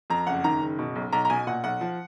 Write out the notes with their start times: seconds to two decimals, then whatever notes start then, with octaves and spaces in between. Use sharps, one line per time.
0.10 F2 A#5
0.27 F#1 F#5
0.44 D#3 A#5
0.61 F#1
0.79 B2
0.95 B1
1.12 B1 A#5
1.25 A#5
1.30 B2 G#5
1.47 A#2 F#5
1.64 B1 F#5
1.81 F3